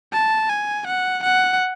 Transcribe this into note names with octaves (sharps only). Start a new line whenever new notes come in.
A5
G#5
F#5
F#5